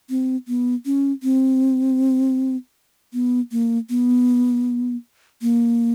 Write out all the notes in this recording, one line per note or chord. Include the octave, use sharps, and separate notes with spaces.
C4
B3
C#4
C4
B3
A#3
B3
A#3